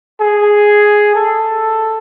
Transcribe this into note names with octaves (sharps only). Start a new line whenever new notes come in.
G#4
A4